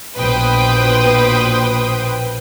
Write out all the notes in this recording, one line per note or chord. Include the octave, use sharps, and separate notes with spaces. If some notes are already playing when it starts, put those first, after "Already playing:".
A#1 B2 B4 C5 G5 D#6